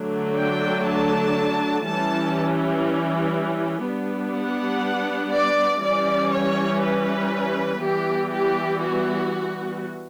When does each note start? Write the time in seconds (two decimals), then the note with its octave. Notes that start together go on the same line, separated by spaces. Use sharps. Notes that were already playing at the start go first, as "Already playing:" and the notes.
Already playing: D3 F#3 A3 D4
0.37 G5
0.88 A5
1.86 E3 G3 C#4 A5
3.86 G3 B3 D4
4.36 F#5
5.34 D5
5.84 E3 G3 C#4 D5
6.33 C#5
6.83 B4
7.83 E3 G3 B3 G4
8.33 G4
8.83 F#4